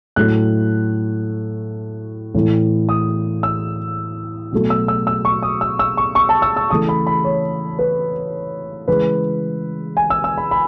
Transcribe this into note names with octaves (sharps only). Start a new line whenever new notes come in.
A2 F#3 A3 F#6
A2 E3 A3
D#6
E6
B2 F#3 A3
E6
E6
E6
C#6
D#6
E6
E6
C#6
C#6
A5
E6
E6
C#3 E3 A3 D#6
B5
B5
C#5
B4
C#3 E3 G#3 B4
G#5
E6
E6
B5
B5